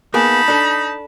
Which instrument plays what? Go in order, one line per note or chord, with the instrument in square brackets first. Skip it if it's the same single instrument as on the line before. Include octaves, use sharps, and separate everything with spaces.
[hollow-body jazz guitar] A#3 B3 G#4 [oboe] D#4 [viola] A5 B5
[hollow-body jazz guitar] D4 A4